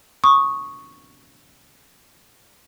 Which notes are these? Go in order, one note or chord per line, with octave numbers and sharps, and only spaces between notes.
C#6 D#6